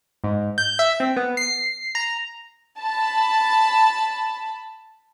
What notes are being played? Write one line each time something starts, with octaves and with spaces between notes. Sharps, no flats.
G#2
G6
E5
C4
B3
C7
A#5
A5 B5